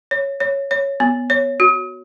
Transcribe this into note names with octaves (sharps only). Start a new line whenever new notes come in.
C#5
C#5
C#5
B3
C#5
F#4